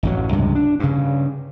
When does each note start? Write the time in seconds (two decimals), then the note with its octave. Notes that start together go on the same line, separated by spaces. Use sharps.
0.03 A1 F#2 F#3
0.33 C#2 G2 C3
0.55 D4
0.80 G2 C#3